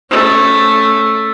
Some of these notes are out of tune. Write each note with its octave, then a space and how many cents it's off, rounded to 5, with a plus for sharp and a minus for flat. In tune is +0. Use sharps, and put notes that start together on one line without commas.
A3 +0 C#4 +0